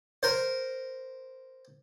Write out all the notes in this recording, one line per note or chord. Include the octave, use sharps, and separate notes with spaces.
A#4 C5